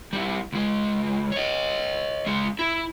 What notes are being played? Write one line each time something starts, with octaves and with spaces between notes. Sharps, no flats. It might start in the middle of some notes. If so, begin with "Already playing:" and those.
G3 E4
C#2 G#3
C#5 D#5
G#3 C#4
E4